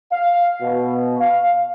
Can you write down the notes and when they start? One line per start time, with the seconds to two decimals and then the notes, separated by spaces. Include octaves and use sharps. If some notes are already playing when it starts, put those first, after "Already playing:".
0.12 F5
0.62 B2
1.20 F5